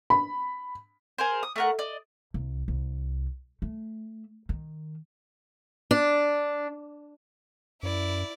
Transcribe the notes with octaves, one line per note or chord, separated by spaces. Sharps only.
B5
G#4 A#4 C5
D#6
A3 A#4 F#5
D5 D#5
C2
C2
A3
D#3
D4
F#2 E4 D5